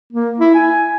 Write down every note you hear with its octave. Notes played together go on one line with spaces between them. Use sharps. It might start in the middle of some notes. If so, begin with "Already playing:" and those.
A#3
E4
G#5